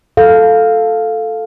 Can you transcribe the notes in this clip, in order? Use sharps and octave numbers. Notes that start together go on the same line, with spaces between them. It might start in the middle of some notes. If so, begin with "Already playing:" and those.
A4 F5